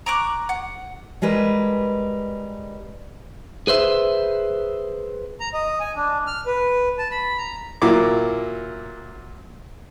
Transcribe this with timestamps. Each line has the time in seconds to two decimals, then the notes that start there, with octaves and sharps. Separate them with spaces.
0.06 A#5 C#6 D6 F#6
0.49 F#5
1.22 G3 G#3 A#4 B4
3.67 G#4 B4 C5 E5
5.40 A#5
5.54 D#5
5.80 G#5
5.96 D4
6.27 F6
6.46 B4
6.98 A5
7.11 B5
7.38 A#5
7.82 A#2 F#3 E4 A#4 D6